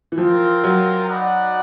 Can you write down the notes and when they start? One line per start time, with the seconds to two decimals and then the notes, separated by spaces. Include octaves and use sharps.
0.12 E3
0.18 F3 C4 F4 A#4
0.64 F#3
1.08 D#4 F#4 B4 D5 F#5